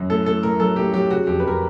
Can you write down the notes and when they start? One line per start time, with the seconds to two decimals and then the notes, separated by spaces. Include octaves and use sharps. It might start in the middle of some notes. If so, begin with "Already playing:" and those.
Already playing: F#2
0.10 A2 A4
0.26 A2 A4
0.43 A2 A#4
0.60 F#3 A4
0.76 A2 G4
0.93 F#3 G4
1.10 C#3 F#4
1.27 F2 G4
1.40 B4
1.44 F2 A#4